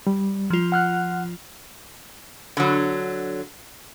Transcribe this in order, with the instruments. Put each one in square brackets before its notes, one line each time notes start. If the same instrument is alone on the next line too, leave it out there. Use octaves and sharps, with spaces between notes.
[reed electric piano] G3
[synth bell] F3 F4
[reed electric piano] F#5 F6 F#6
[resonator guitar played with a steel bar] D3 F#3